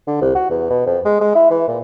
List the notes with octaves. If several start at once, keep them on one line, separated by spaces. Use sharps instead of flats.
D3
C2
F#4
E2
B2
F2
G#3
G#3
E4
E3
A#2